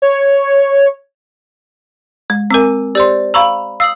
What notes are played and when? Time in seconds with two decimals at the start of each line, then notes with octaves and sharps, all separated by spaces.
0.02 C#5
2.30 G#3
2.51 C4 A#4 G#5 D6 E6
2.95 G4 C5 D5 C6
3.34 F5 A#5 B5 C#6 E6
3.80 F5 D#6 E6 F#7